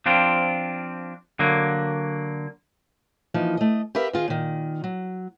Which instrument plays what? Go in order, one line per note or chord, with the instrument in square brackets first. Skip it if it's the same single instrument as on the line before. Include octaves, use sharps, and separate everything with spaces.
[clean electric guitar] F3 C4 D4 F4
D3 F#3 A#3
[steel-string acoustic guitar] E3 F3 A#3 D#4
A3 D#5
G4 A#4 B4 E5 F5
D#3 F4 G#4
A#2 D#3
F#3